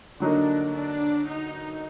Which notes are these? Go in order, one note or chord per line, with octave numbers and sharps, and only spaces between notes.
D3 F#3 A#3 D4 D#4
D4
D#4